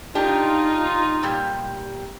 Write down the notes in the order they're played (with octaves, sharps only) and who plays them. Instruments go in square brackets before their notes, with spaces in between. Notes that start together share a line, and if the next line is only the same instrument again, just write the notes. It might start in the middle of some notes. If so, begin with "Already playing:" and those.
[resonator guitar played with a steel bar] D4 G4 [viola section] D#4 F4
[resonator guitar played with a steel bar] A#2 G3 G4